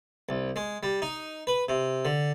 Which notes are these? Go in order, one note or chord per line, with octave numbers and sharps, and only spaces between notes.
C2
G#3
G3
D#4
B4
C3
D3